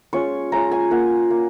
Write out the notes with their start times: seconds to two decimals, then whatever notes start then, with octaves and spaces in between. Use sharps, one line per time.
0.13 G#3 C#4 F4 C#6
0.52 G#3 C#4 F4 A#5
0.72 G#5
0.91 A#3 F4 F#5
1.30 A#3